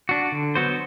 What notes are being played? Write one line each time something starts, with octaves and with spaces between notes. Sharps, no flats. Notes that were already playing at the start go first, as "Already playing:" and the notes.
D4 F#4
D3
F#3 B3 F#4 C5